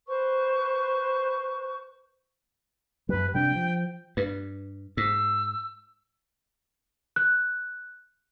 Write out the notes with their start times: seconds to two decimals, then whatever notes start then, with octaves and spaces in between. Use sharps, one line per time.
0.08 B4 C5 C#6
3.09 F#2 G3 B4
3.34 C3 G3 D4 G5
3.55 F3
4.17 G2 B4
4.97 G#2 E6
7.16 F#6